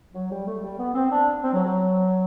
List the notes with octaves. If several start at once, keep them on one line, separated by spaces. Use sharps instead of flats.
F#3
G3
A3
G3
B3
C4
D4
C4
F#3
F#3